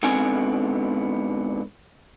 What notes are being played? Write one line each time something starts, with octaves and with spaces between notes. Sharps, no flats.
G#2 D3 B3 C4 G#5